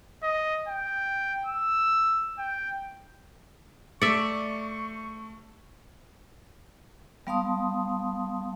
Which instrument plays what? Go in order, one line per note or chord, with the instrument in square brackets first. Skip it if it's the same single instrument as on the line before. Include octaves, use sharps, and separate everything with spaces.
[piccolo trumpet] D#5
G5
E6
G5
[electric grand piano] A3 C#7 [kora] D5 E5 [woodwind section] C#6
[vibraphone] G3 B3 F5 A5 C6 D#6